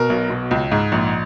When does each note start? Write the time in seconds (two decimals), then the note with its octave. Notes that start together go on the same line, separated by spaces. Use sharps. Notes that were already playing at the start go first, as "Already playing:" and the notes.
Already playing: B2 A#4
0.10 B1
0.30 B2
0.51 C#2
0.72 G#2
0.92 A#1